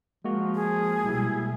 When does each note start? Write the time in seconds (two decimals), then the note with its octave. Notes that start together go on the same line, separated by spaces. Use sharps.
0.25 F3 G#3 A#3 F#4
0.55 G#4
1.04 B2 G3 E4